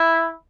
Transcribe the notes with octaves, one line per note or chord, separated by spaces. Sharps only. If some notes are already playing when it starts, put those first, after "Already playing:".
Already playing: E4